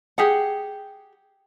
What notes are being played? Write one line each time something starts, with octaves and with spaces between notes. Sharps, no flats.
G4 G#4 F#5